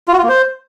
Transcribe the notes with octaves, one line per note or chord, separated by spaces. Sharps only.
F4
F#4
F4
A#3
C5